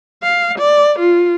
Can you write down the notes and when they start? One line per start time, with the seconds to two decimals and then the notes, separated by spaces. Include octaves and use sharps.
0.23 F5
0.59 D5
0.99 F4